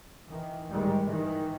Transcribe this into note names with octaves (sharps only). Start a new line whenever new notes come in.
D#3 E3
G#2 D#3 G3 G#3
D#3 E3